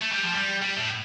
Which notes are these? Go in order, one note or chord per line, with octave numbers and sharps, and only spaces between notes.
A3
G3
F3
G3
G3
A2